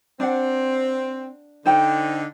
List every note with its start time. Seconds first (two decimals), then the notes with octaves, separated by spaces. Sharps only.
0.20 C4 D4 F#5
1.65 D3 D#4 C5 G5